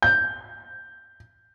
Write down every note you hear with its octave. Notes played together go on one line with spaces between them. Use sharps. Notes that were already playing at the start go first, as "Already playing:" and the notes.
G6